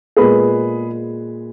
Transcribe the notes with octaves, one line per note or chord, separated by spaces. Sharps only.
A#2 G#3 B3 G#4 B4